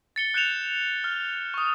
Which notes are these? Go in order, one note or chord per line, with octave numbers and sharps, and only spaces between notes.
A6 C#7 G7
F#6 G6 C#7 E7 F7
F6
C#6 D#6